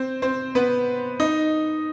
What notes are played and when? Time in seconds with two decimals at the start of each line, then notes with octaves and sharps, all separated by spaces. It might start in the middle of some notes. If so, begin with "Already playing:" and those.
Already playing: C4 C5
0.22 C4 C5
0.55 B3 B4
1.20 D#4 D#5